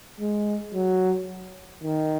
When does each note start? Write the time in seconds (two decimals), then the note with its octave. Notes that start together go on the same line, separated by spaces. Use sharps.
0.20 G#3
0.74 F#3
1.83 D#3